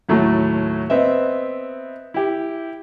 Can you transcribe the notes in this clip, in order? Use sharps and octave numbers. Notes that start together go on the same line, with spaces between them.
D#2 A2 F#3 A3
B3 C4 D#5 E5
E4 G4